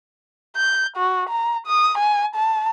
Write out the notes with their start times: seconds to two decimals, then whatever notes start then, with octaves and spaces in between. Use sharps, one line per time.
0.57 G6
0.97 F#4
1.29 A#5
1.67 D#6
1.98 G#5
2.35 A5